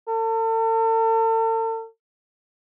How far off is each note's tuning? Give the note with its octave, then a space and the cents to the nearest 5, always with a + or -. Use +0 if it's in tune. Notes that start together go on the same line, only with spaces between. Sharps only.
A4 +40